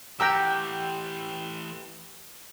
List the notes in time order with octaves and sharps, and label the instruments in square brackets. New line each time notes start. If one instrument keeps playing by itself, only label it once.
[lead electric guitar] E3 A3 [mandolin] G4 F#5 [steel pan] G5 A#5 E6